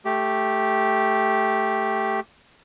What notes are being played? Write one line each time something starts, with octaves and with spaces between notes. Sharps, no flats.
A3 G4